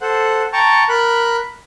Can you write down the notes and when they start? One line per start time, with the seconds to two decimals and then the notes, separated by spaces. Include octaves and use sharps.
0.01 A4 C5 F#5
0.53 G5 A5 A#5 C#6
0.89 A#4 B5 F#6